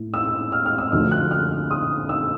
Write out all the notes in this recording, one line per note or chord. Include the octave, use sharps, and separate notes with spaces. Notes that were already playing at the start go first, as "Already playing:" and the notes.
Already playing: A2
E6
F6
F6
E6
D2 D3 F3 F6
F#6
F6
D#6
E6